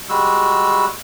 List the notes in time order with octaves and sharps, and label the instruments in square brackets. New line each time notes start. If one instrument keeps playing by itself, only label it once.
[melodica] G3 G#3 F#4 E6